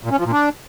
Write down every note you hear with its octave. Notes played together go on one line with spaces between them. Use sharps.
A#2
C#4
F3
A#2
D4